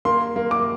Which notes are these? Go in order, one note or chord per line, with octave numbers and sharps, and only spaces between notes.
A#3 C6
A#3
D6